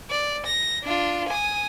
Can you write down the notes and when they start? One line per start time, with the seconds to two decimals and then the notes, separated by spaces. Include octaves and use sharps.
0.10 D5
0.46 A#6
0.84 D4 F4
1.28 G#5 D#6